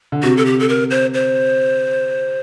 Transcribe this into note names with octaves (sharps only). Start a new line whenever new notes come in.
D3
C3 F#4
A4
G4
A4
A#4
C5
C5